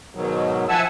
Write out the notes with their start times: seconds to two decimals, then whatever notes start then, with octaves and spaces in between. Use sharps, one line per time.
0.15 G#2 B2 D#3 F#3
0.69 F3 E5 F#5 G#5 A5 E6